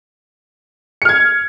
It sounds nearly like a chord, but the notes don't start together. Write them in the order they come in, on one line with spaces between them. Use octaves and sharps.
C#7 F6 G#6